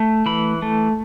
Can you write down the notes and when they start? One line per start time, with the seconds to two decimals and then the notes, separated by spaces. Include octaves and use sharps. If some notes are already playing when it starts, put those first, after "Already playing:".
Already playing: A3
0.26 E3 B5
0.62 A3